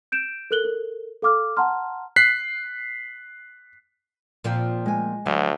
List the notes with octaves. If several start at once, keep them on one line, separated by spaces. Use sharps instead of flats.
G6 D7 E7
A4 A#4 F#6 F#7 G7
A4 A#4
A4 F5 D6 F6
F#5 A5 A#5 C6 F6
F#6 B6 C7
A#2 F3 C4
G#3 G#5
D2 F#3